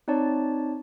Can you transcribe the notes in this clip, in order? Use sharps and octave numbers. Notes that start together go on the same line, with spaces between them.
C4 D#4 C#5 D5 A5